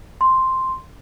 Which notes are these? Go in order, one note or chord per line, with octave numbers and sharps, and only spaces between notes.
C6